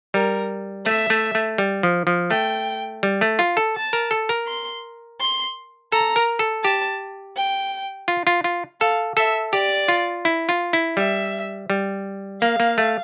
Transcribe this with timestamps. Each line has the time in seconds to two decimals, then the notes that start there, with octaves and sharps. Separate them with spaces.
0.14 G3 A#4
0.86 A3 E5
1.10 A3
1.35 A3
1.58 G3
1.83 F3
2.07 F3
2.31 A3 G5
3.03 G3
3.21 A3
3.39 F4
3.57 A4
3.76 A5
3.93 A#4
4.11 A4
4.29 A#4
4.47 C6
5.20 C6
5.92 A4 A#5
6.16 A#4
6.39 A4
6.64 G4 A5
7.36 G5
8.08 F4
8.27 F4
8.44 F4
8.80 A4 F5
9.17 A4 E5
9.53 G4 D5
9.88 F4
10.25 E4
10.49 F4
10.73 E4
10.97 G3 E5
11.70 G3
12.42 A#3 F5
12.60 A#3
12.78 A3